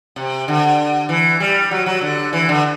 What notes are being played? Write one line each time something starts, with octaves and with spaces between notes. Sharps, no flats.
C3
D3
E3
G3
F#3
F#3
D3
E3
D3